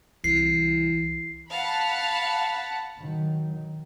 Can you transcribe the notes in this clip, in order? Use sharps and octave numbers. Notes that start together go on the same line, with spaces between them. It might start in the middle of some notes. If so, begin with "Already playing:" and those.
C2 E3 C7
F5 F#5 A5 B5
D#3 F#3